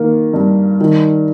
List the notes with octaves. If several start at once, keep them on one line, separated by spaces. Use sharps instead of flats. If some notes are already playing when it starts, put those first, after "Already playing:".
Already playing: D#3 A#3
G2
D#3